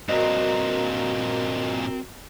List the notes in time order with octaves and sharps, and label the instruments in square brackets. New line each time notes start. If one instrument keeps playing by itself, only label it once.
[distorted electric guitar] G2 A#2 [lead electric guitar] C4 [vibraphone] F#4 A#4 A#5 [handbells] D#5